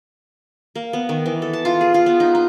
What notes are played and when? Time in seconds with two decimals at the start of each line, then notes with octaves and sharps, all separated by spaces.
0.75 A#3
0.93 B3
1.09 D#3
1.26 E3
1.42 A4
1.53 A5
1.65 F4
1.81 G#4
1.94 F4
2.06 B3
2.20 D#4
2.35 D#4